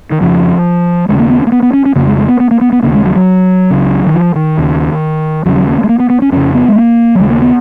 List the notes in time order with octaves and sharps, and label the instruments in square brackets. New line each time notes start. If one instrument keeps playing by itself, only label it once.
[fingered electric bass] D#3
F2 C#3 F3
D#2 C#3 G#3
A#3
B3
C#4
A#3
B3
B3
C#4
C#4
F2 C#3 A#3
G#3
G#3
B3
B3
A#3
B3
B3
D#2 C#3 A#3
G#3
F#3
F#3
C#2 C#3
D#3
F3
D#3
D#2 C#3
D#2 F#3
C#3
F#3
A#3
A#3
G#3
A#3
B3
B3
C#4
F2 C#3 C#4
B3
G#3
A#3
F#3
D#2 C#3 G#3
A#3
B3